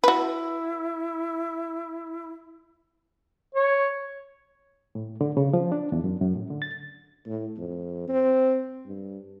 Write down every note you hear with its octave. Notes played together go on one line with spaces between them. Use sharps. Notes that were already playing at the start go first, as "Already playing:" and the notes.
E4 F#4 B4
C#5
A2
D3
C#3
F3
D4
E2
F#2
F#2
A2
D3
A6
A2
F2
C4
G2